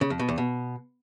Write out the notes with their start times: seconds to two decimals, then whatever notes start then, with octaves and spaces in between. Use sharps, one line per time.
0.01 C#3
0.10 F2
0.19 B2
0.29 E2
0.38 B2